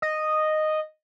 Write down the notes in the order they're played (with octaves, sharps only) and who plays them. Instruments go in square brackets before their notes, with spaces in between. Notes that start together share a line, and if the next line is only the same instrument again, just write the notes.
[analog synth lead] D#5